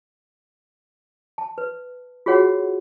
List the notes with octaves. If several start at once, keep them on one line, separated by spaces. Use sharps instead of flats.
A5
B4
F4 F#4 G#4 C#5 F#5